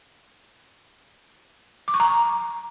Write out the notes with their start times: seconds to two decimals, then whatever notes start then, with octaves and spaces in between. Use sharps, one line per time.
1.88 D6
1.94 C#6
2.00 A#5